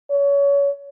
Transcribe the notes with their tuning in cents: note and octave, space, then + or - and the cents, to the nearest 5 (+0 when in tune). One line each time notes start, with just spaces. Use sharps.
C#5 +30